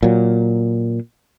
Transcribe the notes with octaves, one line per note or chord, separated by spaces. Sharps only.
A#2 F#3